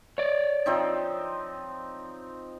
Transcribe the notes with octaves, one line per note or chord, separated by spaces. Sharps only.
C#5 D5
F3 C4 D#4